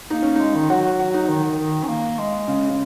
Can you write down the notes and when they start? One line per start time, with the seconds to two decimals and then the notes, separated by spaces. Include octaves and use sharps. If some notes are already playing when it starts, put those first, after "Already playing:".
0.10 A#3 D#4
0.22 C#4
0.35 G#3 D#4
0.55 D#3
0.70 F#3 F#4
0.99 F#4
1.14 D#4
1.29 D#3
1.44 D#3
1.59 D#3
1.84 C#4
1.88 A#3
2.19 G#3
2.48 C#3
2.70 C#3